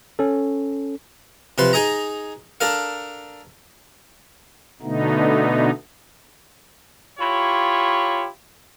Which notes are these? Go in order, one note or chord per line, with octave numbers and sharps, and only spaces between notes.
C#4 A4
C3 F3 B4 C6
D#4 G#4 D#5 A#5
D4 A4 A#4 F5
B2 D3 A3 B3 D#4
E4 F4 G4 C#5